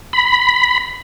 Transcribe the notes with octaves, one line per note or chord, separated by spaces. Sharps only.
B5